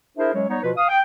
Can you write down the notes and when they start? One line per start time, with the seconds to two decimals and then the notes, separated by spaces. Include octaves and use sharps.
0.17 D4 E4 G#4 A#4 C5 E5
0.33 F#3 G#3 C#4 C#5
0.49 G3 B3 D#4 C#5
0.63 B2 F3 F4 B4
0.76 F5 D#6
0.88 G5